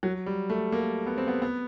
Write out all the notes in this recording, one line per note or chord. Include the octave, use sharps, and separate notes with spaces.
F#3
G3
A3
A#3
B3
C4
B3
B3